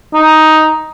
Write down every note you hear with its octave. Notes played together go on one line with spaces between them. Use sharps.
D#4